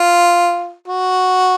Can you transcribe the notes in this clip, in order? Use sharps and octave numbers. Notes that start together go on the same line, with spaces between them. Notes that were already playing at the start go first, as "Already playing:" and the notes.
Already playing: F4
F#4